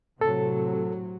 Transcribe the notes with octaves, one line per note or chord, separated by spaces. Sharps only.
A2 C3 F#3 A4